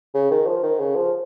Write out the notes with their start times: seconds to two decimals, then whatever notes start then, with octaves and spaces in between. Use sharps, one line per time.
0.14 C#3
0.31 D#3
0.46 F3
0.63 D#3
0.79 C#3
0.96 F3